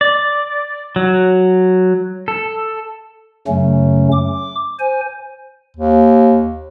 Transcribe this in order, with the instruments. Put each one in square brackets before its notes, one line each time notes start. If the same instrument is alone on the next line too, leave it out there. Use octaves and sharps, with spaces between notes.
[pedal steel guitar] D5
F#3
A4
[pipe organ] F#2 C#3 F#3 A3 C#4
D6
C5 G#5
[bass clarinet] D#2